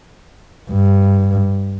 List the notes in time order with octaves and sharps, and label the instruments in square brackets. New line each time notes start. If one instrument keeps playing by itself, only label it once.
[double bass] G2